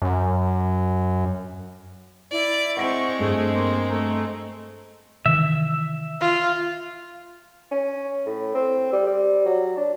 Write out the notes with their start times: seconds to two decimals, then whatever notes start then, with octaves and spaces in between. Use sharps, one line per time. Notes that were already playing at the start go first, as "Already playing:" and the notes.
0.02 F#2
2.32 E4 D5
2.77 G#3 C4 F#5 C#6 A#6 D7
3.20 G2 A3 G#4
3.54 A#3 C6
3.89 A3 A#5
5.26 C3 D#3 E3 E5
6.21 F4
7.71 C#4
8.26 A2
8.55 C4
8.92 G3
9.06 G3
9.46 F#3
9.77 D4